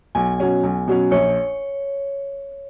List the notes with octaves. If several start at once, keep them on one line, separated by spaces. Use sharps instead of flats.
B1 G#5
B2 F#3 C#4
B1
B2 F#3 C#4
A#1 C#5